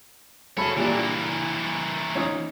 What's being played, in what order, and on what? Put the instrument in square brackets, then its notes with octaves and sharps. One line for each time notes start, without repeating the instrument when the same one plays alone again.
[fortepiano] F#2 A4 B5 [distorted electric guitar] G#4 C#5
[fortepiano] A#2 G3 D4 [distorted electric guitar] E3 A#3
[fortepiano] C#4 D#4